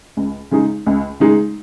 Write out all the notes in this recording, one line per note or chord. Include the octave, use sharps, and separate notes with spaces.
C#2
C#3 G#3 D#4 G#4
C#2
C#3 G#3 D#4 G#4